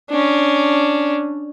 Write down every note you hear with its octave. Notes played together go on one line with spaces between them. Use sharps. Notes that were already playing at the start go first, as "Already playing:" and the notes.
C#4 D4